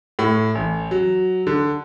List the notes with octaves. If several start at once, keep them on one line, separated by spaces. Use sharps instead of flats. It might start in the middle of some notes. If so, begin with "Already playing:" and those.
A2
A1
F#3
D3